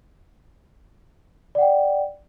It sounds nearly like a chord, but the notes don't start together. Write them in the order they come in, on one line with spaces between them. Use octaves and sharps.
D5 F#5 G5